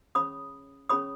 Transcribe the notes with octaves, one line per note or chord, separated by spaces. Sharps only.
C#4 G#4 C#5 B5 D#6
C#4 G#4 C#5 B5 D#6